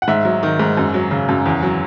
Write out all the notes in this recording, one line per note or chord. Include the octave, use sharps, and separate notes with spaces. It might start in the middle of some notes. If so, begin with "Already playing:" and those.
F#5
G#2 E5
F#3
D#3
G#2
F#2
F#3
C#3
F#2
E2
F#3